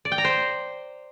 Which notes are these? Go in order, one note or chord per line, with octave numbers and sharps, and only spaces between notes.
D5
G5
A#5
C5